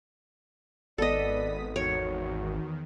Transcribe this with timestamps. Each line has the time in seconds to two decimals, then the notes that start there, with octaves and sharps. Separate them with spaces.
0.98 G#1 B3 A4 D5 D#5 D#6 B6
1.76 E2 D#3 F#4 C#5